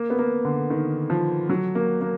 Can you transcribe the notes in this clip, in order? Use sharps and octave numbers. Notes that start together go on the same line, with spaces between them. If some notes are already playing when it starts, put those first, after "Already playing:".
Already playing: A#3
B3
A#3
D3
D#3
F3
F#3
A#3
A#3